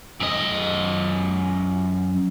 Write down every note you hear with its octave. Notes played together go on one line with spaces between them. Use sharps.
F#2 D#5